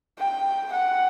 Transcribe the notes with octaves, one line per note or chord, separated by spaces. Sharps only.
G5
F#5